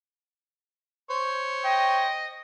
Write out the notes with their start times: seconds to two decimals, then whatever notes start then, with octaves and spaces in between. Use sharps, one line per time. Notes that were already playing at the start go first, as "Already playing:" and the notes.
1.11 C5 C#5
1.65 D#5 G5